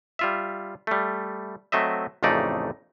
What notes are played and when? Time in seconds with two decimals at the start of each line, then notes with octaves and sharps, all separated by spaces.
0.19 G3 F4 E5
0.87 G3 A3
1.72 F#3 A3 C4 D#5 E5
2.23 A1 F2 C#3 A3 D#4 D5